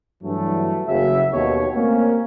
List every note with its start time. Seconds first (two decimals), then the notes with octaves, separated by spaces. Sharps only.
0.24 G2 E3 F#3 A3
0.88 F#1 C#3 F#4 E5
1.33 D#2 B2 C#5
1.76 A3 A#3 C4 C#4